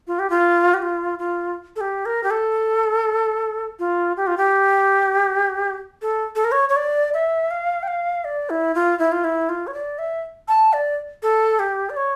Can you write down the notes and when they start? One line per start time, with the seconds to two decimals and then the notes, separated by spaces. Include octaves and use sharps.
0.07 F4
0.19 G4
0.30 F4
0.74 G4
0.82 F4
1.19 F4
1.76 A4
1.81 G4
2.06 A#4
2.24 G4
2.31 A4
3.79 F4
4.17 G4
4.27 F4
4.37 G4
6.02 A4
6.36 A4
6.44 A#4
6.52 C#5
6.69 C#5
6.76 D5
7.14 E5
7.51 F5
7.83 G5
7.88 F5
8.25 D5
8.50 E4
8.75 F4
8.99 E4
9.12 F4
9.24 E4
9.49 F4
9.67 C#5
9.74 D5
9.99 E5
10.48 A5
10.73 D5
11.23 A4
11.59 G4
11.90 D5
11.97 C#5